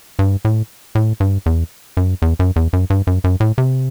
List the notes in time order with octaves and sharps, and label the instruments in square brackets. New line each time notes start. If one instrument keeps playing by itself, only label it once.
[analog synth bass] G2
A2
A2
G2
E2
F#2
E2
F#2
E2
F#2
G2
F#2
F#2
A2
C3